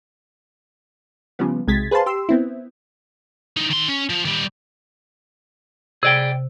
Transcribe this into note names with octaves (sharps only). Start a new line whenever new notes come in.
C#3 F3 G3 B3
B1 C3 G#3 G#6 A6 B6
G#4 B4 C5 F5 A5 C6
G4 C6 E6
B3 C4 E4
E3 D#4
D#3 C6
C#4
F3
D#3 G3
C3 G#4 D5 G5